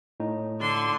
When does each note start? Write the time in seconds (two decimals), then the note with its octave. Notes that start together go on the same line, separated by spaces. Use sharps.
0.20 A2 D#4
0.60 D3 C6